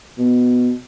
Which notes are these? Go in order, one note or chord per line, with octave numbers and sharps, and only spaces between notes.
B2